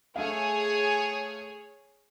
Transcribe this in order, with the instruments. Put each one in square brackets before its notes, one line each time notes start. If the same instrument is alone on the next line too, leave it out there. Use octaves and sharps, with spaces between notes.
[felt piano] A3 F5 [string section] G#4 C#5